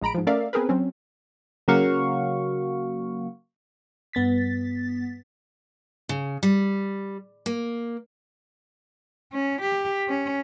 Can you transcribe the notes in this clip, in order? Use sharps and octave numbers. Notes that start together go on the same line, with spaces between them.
A#1 G#3 A#5 B5 D7
G#2 F3
A3 C#4 A#4 D5 E5 F5
B3 C4 G#4 A#4 B4
F#3 C4 C#4
C#3 F#3 A#3 F#4 F5 C#6
G2 B3 A6 B6
C#3
G3
A#3
C#4
G4
C#4